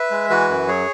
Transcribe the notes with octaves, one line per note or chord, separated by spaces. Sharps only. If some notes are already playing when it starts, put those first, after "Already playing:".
Already playing: B4 E5
G#3
E3 F#4 B4
F#2
F#3 G#4 C#5